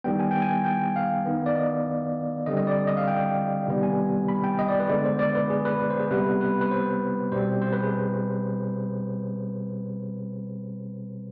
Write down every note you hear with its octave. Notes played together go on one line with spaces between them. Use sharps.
D#3 G3 B3 G5
G#5
G5
G#5
G5
F5
D#3 B3
D5
D#5
D3 G3 C4 D#5
D#5
D5
D#5
F5
G5
C3 D#3 G3 B3
G#5
B5
G5
D#5
D5
B4
D3 G#3 B3 D5
C5
D5
B4
G#4
B4
C5
G#4
C3 G3 B3 B4
B4
B4
C5
B2 G3 C4 C5
C5
B4
G#4